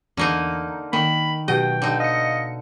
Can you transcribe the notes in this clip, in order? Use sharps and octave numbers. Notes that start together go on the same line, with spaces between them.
E2 D3 A#3 D#4 F6 D#7
D#3 A#3 B5
B2 F#3 F#4 G4 D#5 G5
D3 D#4
D#5 F5 C#7